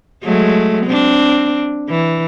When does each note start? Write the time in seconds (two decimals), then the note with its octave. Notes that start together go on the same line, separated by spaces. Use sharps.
0.24 F#3 G#3 A3
0.86 C4 D4
1.89 E3